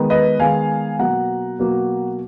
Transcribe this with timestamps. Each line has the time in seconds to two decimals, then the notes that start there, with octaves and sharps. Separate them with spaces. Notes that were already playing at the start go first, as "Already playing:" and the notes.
Already playing: D#3 G#3 B3
0.10 B4 D#5
0.39 D#3 G#3 B3 F5 G#5
0.99 B2 F#3 A#3 F#5 A#5
1.59 B2 F#3 A#3